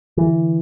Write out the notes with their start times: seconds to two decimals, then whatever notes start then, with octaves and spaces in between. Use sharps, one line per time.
0.17 D3 E3